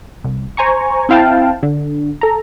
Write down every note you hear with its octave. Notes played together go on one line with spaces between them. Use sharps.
C2
C5 G#5 A#5 C#6
C4 E4 F5 G5 A5
D3
A4 A#5